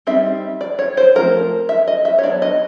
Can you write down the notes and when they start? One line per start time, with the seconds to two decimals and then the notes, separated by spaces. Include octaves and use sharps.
0.07 G3 C4 D#4 E5
0.61 D5
0.79 C#5
0.97 C5
1.15 F3 A3 C4 A#4
1.69 E5
1.88 D#5
2.05 E5
2.18 C#5
2.23 F#3 B3 D4 D5
2.42 D#5